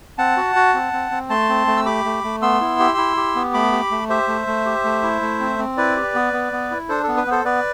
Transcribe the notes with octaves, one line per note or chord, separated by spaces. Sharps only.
C4 F#5 A5
F#4
F#4
C4
C4
C4
A3 A5 C6
C4
A3
E6
G4 B5 D6
A3
A3
B3 C6 E6
E4
G4
E4
G4
B3
A3 B5 D6
G4
A3
G4 C5 E5
A3
A3
G4
A3
E4
A3
C4
C4
E4 B4 D5
G4
B3
B3
B3
E4
D4 A4 C5
B3 A4
B4
B3 A4 C5
B3 B4 D5